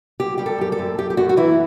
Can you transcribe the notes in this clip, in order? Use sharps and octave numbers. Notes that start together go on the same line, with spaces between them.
F#2 G4
G3 G4
A4
F#2 G4
A4
F#2
F#2 G4
G4
F#2 F#4
F#4
E3 E4